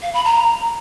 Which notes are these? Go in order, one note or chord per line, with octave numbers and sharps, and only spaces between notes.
F5
B5
A#5